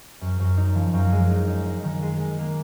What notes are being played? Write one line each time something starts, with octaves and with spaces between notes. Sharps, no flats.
F#2
F#2
D#4
F3
F#2
G#3
D#4
D#4
G#3
D#3
G#3
G#3
A#3